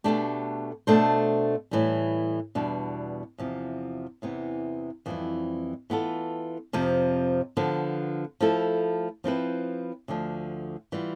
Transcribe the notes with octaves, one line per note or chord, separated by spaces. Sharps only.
B2 A3 D4 G4
B2 A3 D4 A4 C5
A2 E3 G3
E2 B2 G3 D4
E2 C3 F3
E2 C3 E3 B3
F2 E3 G3 C4 E4
E3 B3 F4 A4
F2 C3 F3
D3 F3 B3
F3 A3 E4 A4
F3 C4 E4 B4
D2 D3 F3
E3 G3 B3 F4